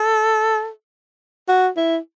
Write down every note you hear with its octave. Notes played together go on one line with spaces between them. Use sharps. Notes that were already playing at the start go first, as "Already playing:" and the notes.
Already playing: A4
F#4
E4